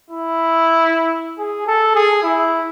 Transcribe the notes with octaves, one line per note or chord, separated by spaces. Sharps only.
E4
G#4
A4
G#4
E4